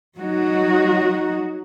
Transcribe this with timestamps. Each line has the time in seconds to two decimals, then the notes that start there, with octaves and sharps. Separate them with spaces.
0.17 F#3 D#4 F#4